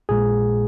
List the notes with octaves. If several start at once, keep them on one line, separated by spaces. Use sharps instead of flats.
A#1 A#2 G#3 G#4